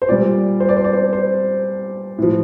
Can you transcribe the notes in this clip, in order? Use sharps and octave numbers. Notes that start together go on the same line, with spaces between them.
C5
A#2 G3 D5
C5
D5
C5
D5
C5
C5
A2 F3